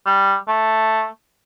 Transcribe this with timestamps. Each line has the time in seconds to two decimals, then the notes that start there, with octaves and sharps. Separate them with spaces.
0.06 G3
0.48 A3